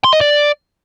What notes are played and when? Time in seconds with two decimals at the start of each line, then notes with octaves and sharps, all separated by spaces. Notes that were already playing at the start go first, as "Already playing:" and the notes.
0.04 C6
0.13 D#5
0.21 D5